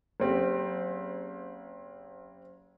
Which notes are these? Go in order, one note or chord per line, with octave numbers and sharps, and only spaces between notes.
F#1 C4 G4